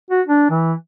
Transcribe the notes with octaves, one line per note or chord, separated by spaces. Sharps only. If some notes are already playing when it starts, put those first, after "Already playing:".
F#4
D4
E3